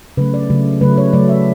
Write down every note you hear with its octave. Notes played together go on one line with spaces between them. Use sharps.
C#3 F#3 A3 B4
D5
C#3 F#3 A3
C#3 F#3 A3 B4
C#5
C#3 F#3 A3 D5
E5